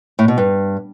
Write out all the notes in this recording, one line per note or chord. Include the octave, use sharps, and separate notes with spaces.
A2
B2
G2